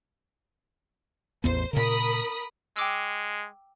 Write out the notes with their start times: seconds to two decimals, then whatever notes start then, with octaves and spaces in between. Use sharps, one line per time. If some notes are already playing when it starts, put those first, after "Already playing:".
1.44 A1 E2 B3 C5
1.73 A#2 C#3 A#4 B5 D#6
2.77 G#3 G5 D6 E6